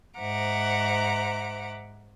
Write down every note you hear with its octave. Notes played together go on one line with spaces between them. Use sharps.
G#2 C5 E5 F#5 A#5 D6